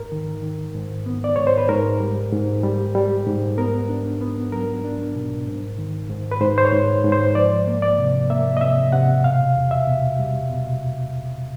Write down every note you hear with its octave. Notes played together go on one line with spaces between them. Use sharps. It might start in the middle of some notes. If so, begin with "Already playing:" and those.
Already playing: G#2 A#4
D#3
D#3
G#2
B3
D5
G#2 C#5
C5
B4
G#2 A#4
G3
G#2
G3
G3
G#2
B3 A#4
D4
B3
F#3 A#4
D4
B2
G#2
D#3
G#2
B4
G#2 C5
C5
C#5
G#2
G#2
C5
F3 D5
A#3
D5
C3
A#3 E5
D#5
C3 E5
C3 F#5
B2 F5
E2
E5
B2
G3
B2